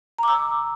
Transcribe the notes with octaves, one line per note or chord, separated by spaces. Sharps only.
A#5 D6 E6